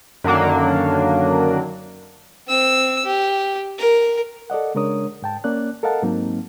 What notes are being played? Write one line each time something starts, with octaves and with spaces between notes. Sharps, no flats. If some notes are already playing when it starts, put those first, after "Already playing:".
F#2 D3 D#3 F#3 A#3 D4
C4 E6
G4
A#4
A4 D5 D#5 F#5
C#3 G#3 D4 A#4 C#5 D#6
G#2 G5 A5
A#3 C#4 D5 F#6
A4 A#4 D#5 F5 F#5 A5
G#2 F#3 A#3 C4 D#4